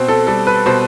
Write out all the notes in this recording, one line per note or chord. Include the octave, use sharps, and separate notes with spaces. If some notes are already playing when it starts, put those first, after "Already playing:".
Already playing: B2 C4
A4
G3 A4
B4
B2 C5